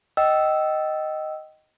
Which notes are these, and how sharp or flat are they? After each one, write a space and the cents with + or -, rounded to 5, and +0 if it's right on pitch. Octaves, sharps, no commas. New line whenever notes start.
D#5 +0 G5 -25 E6 +0